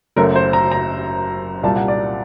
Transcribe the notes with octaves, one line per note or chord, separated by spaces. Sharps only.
F#1 F#2 F#3 A3 A#4
C5
A#5
A#5
C2 A#2 G3 A#3 A5
F#5
D5